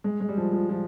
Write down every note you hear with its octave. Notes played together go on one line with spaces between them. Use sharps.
G#3
G#3
G3
F3
F3
F3